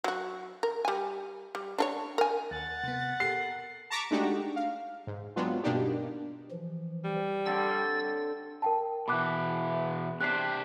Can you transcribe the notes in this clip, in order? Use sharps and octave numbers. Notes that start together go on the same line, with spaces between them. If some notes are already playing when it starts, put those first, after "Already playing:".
F#3 F#4
A#4
G3 G#5
G3
D4 A4 C#5
A#4 G#5
D#2 F#5 A6
C3 B3
G4 A4 A#4 C7
A5 A#5 C#6 D6 B6
G#3 A3 D4 D#4 F#4 G4
F5
G#2
F#3 G#3 B3 C4 D4 F4
G2 B2 A#3 D4 D#4 G4
E3 F3
G3
D3 C4 C#5 E6 A6
A#4 G5 A5
B2 E3 B5 D6 F#6
C3 C4 D4 F#6 B6 C7